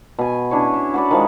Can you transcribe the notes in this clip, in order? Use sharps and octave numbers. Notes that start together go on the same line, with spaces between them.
B2 G#5
C#4 D4 E4 C#5
E5
F#4 B4 D5
D#3 F3 G#3